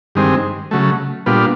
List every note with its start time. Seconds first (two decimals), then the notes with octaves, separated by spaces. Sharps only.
0.15 G2 D#3 G#3 C4
0.71 C#3 F#3 A3
1.26 A#2 G3 B3 D4 F4